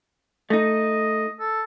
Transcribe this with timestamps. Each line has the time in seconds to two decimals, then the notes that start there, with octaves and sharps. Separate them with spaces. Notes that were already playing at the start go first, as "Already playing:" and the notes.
0.50 A3 D#4 D#5
1.40 A4